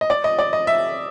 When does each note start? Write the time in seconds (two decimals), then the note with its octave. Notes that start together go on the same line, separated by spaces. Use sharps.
0.01 D#5
0.10 D5
0.24 D#5
0.39 D5
0.53 D#5
0.67 E5